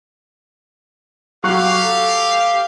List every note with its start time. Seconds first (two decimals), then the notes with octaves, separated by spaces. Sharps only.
1.44 F#3 G4 F5 C#6 F#6
1.82 A4